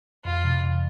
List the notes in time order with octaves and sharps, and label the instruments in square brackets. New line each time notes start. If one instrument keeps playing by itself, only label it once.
[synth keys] F2 [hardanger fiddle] F4
[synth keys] C3 E3
F2